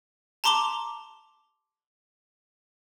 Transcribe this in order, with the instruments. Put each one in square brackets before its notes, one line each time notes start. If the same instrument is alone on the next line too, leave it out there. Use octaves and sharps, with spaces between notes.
[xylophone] A5 A#5 C6 D6 F7 G7